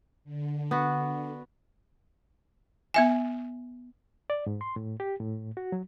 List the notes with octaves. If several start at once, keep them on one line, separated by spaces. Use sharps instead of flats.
D3
B3 F#4
B3 E5 G#5
D5
G#2
C6
A2
G4
A2
F#4
F#3